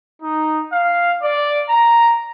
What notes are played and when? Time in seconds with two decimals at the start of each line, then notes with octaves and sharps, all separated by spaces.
0.20 D#4
0.72 F5
1.21 D5
1.68 A#5